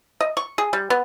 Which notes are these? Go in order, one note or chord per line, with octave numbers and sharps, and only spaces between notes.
D#5
C#6
G#4
G3
B3